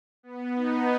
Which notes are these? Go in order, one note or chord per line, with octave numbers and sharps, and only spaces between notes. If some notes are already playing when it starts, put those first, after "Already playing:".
B3
D#4